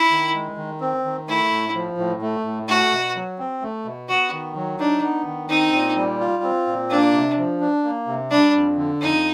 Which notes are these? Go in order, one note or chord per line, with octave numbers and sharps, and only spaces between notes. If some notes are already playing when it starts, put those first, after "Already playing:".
Already playing: E4
D#3
G#3
D#3
C4
D#3
A3 E4
A2
F3
A2
A3
A2
A3 F#4
B2
F#3
C4
A3
B2
B3 F#4
D#3
F#3
D4 D#4
B3
D#3
C4 D#4
A#2
G3
F4
C4
A#2
A#3 D4
C3
F3
D4
A#3
C3
G3 D4
F2
D3
F2 D#4